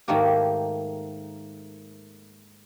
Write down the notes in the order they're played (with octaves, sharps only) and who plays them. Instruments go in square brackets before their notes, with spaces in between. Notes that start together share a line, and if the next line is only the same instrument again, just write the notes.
[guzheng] G#2 D#3 A3 A#3 F#4 G4